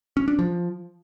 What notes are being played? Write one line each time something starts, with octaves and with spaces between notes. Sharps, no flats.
C#4
D4
F3